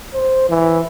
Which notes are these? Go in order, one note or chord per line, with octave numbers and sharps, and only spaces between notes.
C5
E3